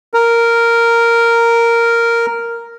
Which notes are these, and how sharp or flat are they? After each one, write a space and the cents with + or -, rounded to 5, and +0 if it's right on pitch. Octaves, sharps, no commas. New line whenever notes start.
A#4 -5